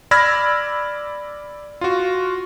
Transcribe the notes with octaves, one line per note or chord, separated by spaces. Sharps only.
D5 B5 E6 F6 G#6 A#6
F4 F#4